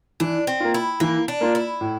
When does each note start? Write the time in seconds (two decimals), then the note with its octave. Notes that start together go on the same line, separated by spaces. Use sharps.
0.20 E3 D4
0.47 C4
0.60 A#3 F4
0.74 E4
1.00 E3 A#3
1.28 D4
1.41 A#3 F4
1.55 E4
1.81 A2